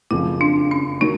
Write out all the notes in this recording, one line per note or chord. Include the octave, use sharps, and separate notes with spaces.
F#1 F2 C#3 F3 E4
D4
C#4
D#3 F#3 D#4